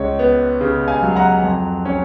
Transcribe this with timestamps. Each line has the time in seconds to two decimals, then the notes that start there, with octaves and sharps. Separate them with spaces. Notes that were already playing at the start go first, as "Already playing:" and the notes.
Already playing: C#2 C#5
0.19 B3
0.61 C#3
0.88 F5 G#5
1.02 F#3
1.16 F#5 A#5
1.44 F2
1.85 C#4